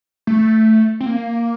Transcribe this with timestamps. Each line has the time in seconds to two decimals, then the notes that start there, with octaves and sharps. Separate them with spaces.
0.27 A3
1.01 C4
1.06 A#3